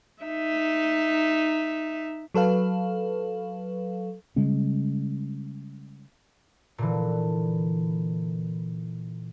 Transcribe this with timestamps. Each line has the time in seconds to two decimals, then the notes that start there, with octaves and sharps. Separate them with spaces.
0.23 D#4 E5
2.34 F#3 A4 B4 F5
4.36 C#3 G3 G#3 C#4
6.78 A#2 D3 E3